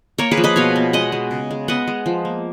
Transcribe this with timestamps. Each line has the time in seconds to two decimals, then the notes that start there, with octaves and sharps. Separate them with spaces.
0.18 A#3 A#4 C#5
0.31 G#4 B4
0.37 F3
0.44 B4 D#5
0.56 B2 C#5 F5
0.76 B3
0.93 G#3 D#5 F#5
1.12 G#3
1.31 C#3
1.51 G#3
1.68 B3 D#5 F#5
1.88 G#3
2.06 F3
2.25 A#3